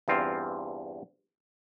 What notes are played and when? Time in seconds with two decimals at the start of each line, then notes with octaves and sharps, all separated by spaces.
0.08 E2 G2 C4 F4